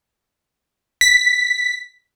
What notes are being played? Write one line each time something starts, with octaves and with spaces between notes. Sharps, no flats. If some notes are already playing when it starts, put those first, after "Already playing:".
B6